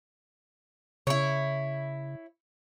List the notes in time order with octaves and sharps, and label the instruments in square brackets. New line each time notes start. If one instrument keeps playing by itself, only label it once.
[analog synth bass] C#3 [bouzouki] E4 C#5